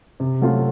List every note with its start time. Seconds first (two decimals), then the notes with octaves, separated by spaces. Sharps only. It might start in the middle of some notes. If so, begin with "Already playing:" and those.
0.20 C3
0.41 F#3 A3 C4 F4